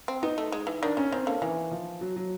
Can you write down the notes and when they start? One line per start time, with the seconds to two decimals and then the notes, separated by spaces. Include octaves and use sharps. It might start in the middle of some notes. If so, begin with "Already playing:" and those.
0.08 C4
0.23 B3 D#4
0.38 A3
0.52 G#3
0.67 E3
0.82 D#3 D4
0.97 D#3 C#4
1.12 D#3 C4
1.27 D3 A#3
1.42 D#3 E3
1.71 F3
2.01 F#3
2.16 F#3